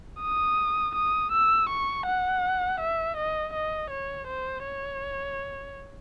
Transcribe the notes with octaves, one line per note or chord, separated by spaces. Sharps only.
D#6
D#6
E6
C#6
F#5
E5
D#5
D#5
C#5
C5
C#5